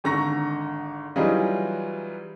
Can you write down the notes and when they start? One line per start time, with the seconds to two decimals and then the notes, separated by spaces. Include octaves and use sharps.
0.04 G#1 D3 A#5 C#6 A#6
1.16 E3 F#3 G3 D#4 F4 G#4